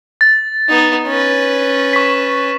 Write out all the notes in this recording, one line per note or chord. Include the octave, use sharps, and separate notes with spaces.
A6
B3 D#4
C#4 B4
C#6 B6